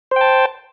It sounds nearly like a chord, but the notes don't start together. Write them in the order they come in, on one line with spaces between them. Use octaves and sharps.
C5 G5 A5